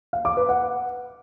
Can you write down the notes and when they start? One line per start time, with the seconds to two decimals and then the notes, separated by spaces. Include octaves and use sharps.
0.13 F5
0.25 D6
0.37 B4
0.49 F#5